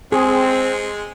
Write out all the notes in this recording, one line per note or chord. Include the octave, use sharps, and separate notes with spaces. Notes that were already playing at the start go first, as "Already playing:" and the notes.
G#3 C4 G#4